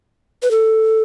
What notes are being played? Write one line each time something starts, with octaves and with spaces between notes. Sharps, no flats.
B4
A4